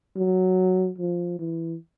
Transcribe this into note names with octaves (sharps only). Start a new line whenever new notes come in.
F#3
F3
E3